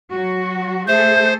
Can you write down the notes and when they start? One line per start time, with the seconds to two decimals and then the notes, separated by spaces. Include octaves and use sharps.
0.11 F#3 F#4
0.88 A3 G#4 A4 C5 E5 G6